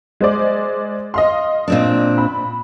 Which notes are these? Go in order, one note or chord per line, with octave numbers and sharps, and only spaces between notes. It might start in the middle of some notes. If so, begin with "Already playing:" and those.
G#3 C5 D5
D#5 F5 C6
A#2 C4 D4
B5